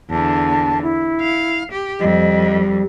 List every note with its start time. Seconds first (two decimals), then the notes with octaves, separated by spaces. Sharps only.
0.10 E2 D3 A5
0.82 E4
1.21 F5
1.72 G4
2.01 F2 G3 D#5